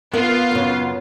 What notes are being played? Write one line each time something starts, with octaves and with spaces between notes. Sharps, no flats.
B3 F4 A#4
F#2 C#3